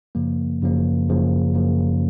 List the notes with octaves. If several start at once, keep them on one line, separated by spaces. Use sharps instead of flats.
F#2 C#3 F3 A#3
F#2 C#3 F3 A#3
F#2 C#3 F3 A#3
F#2 C#3 F3 A#3